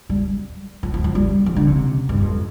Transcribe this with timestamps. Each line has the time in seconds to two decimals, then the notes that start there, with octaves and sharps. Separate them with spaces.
0.09 G3
0.83 F3
0.94 F3
1.04 F3
1.15 G3
1.46 F3
1.56 D3
1.67 C3
2.09 G2
2.22 F2